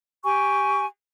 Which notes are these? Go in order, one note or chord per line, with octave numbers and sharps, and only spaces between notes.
G4 G#5 C#6